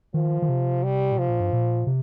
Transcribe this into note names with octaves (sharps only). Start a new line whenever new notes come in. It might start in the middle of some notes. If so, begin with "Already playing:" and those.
D#3 F3
D#3
C3
G3
A#2
C3 F3
A#2
G2
A#2
C3